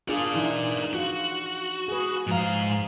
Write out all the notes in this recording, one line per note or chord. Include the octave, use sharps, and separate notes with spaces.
D4 F4 G#4 A#4 D5
E3 D#4 E4
F4 F#4
G#4 B4
G#2 F3 F5 A#5